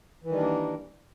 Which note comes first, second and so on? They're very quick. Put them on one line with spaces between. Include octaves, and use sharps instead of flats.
E3 D#3 G3 D4 A#3